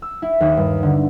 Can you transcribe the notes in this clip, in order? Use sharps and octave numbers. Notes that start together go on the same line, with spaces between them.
E6
E4
D#2
G2
D3